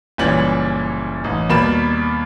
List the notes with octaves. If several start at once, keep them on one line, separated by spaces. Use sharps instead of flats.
F#1 A#2 E3 G3 C#4 F#7
A1 D#4
D#2 B2 G3 A#4 B5 E7